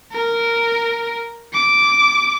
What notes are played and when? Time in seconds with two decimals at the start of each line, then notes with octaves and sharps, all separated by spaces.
0.13 A#4
1.53 D6